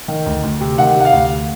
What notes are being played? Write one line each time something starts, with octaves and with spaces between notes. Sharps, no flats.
D#3
D2
D2
C3
D#3 F#5
C3 F#5
F5
D2